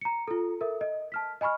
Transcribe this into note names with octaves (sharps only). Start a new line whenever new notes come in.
A#5 C#7
F4 A4
A4 A#4 E5
D#5
A5 F6 B6
D#5 G#5 B5 C#6 F6